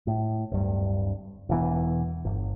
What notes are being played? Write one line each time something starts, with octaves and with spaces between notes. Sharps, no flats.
A2
D1 G2
E1 E3 B3
G1